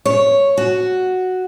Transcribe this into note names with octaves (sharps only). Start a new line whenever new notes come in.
C#5
F#4